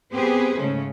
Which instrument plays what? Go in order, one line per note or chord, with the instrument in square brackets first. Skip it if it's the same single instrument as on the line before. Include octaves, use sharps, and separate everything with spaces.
[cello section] B3 C4 G4 G#4 B4 C5
G#2 C#3 G#3 A3 C#4